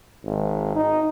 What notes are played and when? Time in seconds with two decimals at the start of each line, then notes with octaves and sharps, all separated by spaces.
0.24 G#1
0.75 D#4